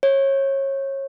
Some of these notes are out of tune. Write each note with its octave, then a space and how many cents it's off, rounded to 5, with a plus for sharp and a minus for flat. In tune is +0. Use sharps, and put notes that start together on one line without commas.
C#5 -25